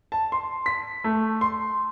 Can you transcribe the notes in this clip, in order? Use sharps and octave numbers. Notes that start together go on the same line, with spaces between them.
A5
C6
B6
A3
C6